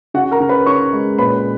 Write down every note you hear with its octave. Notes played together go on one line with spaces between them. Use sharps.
C#3 F#4 F#5
A#4 A#5
C#3
B4 B5
C#3 C#5 C#6
G#3
A#2 B4 B5